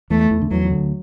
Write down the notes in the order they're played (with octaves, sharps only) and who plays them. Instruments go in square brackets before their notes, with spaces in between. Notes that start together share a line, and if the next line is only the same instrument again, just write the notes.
[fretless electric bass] E2 E3 [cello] A3
[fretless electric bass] E2 E3
D3
[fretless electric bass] E2 E3 [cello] F#3
[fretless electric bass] E3
D2 D3